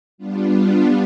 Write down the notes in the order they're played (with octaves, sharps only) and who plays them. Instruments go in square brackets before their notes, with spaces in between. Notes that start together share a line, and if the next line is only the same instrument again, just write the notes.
[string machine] G3 B3 D4 F4